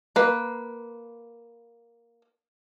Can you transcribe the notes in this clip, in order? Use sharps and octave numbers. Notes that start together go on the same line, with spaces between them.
A#3 B4